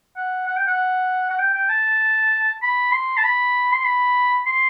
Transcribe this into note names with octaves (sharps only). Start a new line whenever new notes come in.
F#5
F#5
G5
F#5
F#5
G5
G5
A5
B5
C6
A5
B5
C6
B5
C6